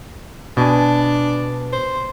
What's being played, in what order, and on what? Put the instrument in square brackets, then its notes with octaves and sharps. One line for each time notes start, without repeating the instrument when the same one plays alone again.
[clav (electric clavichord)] B2 G#5 [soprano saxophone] D4
[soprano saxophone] C5